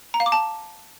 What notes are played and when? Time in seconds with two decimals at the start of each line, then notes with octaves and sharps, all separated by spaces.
0.14 A#5
0.20 F5
0.26 D6
0.32 A5